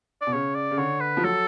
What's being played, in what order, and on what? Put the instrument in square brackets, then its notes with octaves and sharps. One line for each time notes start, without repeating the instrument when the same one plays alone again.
[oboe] D5
[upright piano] B2
[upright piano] C#3 [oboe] C#5
[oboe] D5
[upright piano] C#3
[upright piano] D3 [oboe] C#5
[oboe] B4
[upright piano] F3
[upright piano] F#3 [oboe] A4